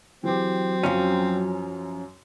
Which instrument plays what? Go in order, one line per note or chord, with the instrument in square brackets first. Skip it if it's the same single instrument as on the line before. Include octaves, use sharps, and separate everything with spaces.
[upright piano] E3 G4 [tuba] F#3 [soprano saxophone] C4
[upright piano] F#2 [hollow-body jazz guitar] F3 C#4